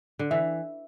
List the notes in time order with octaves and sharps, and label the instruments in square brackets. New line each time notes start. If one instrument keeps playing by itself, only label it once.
[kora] D3
[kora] E3 [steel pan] E5